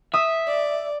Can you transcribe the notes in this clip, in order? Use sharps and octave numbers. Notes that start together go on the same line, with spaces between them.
E5 D#6
D5